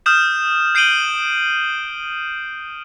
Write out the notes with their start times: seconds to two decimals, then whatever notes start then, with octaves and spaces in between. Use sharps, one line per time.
0.06 D#6 F6 G6 E7
0.75 G6 C7 D7 D#7 F#7 G7